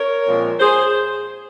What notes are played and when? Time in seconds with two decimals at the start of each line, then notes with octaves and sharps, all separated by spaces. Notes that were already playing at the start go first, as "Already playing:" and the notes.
Already playing: A#4 C#5
0.27 A#2 F3 G#3 C4
0.60 G#4 C5